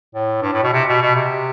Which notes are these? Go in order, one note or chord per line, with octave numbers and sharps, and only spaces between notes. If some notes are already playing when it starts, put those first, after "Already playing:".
A2
G2
A2
B2
C3
B2
B2
C3